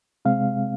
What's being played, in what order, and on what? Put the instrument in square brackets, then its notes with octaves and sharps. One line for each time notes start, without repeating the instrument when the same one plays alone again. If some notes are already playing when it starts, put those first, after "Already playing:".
[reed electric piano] C3 G#3 C4 F5